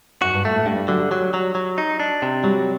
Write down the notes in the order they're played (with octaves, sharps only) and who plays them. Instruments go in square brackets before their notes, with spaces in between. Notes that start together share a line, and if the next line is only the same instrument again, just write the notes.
[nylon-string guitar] F#2 [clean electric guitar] F#4
[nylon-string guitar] G2
[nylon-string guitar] A#2 [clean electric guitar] A3
[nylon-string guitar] A2
[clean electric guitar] G2 [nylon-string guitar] A3
[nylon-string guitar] G3
[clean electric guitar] D3 [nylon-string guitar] F#3
[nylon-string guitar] G3
[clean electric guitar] F#3
F#3
F#3
D#4
D4
C3
[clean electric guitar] F#3 [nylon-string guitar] G3